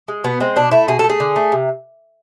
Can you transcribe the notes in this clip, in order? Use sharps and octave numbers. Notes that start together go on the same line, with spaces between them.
G#3
B2 B3
G#3 C4
B2 D4
A3 E4
B2 G#4
A3 A4
G#4
D3
A3
C3